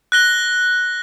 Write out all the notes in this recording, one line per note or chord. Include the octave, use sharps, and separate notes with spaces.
F#6 A#6 G7